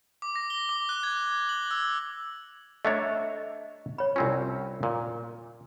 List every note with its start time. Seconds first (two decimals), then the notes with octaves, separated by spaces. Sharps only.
0.22 D6
0.36 A#6
0.50 G7
0.69 D6
0.89 F#6
1.03 G#6
1.49 F#7
1.71 E6
2.85 A3 D4 C#5 D#5 E5 A#5
3.98 C#5 B5
4.16 C2 C4 C#4 F4
4.83 A#2